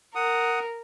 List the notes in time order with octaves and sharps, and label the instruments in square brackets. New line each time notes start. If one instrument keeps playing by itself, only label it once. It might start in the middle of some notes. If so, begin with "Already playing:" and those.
[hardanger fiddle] A#4 [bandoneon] F#5 D#6